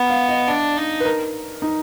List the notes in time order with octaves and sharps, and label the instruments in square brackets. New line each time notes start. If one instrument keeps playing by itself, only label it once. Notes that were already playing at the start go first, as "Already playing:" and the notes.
Already playing: [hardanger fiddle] B3
[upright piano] F5
D#5
[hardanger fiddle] D4 [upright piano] D5
[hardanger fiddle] D#4
[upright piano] B4
A#4
D#4